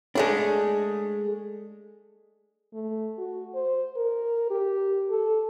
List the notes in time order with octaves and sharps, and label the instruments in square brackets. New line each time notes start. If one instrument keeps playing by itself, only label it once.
[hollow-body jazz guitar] G#3 A3 D4
[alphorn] A3
F#4
C5
A#4
G4
A4